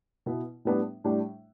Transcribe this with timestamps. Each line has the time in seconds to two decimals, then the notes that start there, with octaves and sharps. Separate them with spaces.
0.26 B2 B3 E4
0.65 A2 G3 B3 D4
1.04 A2 G3 D4